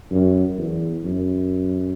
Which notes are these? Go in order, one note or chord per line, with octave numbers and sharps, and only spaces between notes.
F#2
E2
F#2